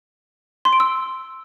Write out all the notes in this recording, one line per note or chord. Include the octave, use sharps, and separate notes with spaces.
C6
D7
E6